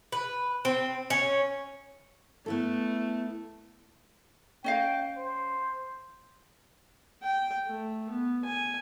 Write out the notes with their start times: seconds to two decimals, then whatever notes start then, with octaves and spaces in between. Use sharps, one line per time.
0.12 B4
0.65 C4
1.10 C#4
2.46 A3 B3 E4 A4
4.64 C#4 D#5 F5 G5
5.17 C5
7.22 G5
7.67 A3
8.10 B3
8.45 G#5